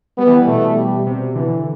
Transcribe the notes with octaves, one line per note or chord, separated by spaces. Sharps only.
G3 B3
E3
B2 A3
G3
C3
D3 E3